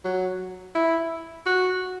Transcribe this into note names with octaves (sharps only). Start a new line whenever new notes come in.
F#3
E4
F#4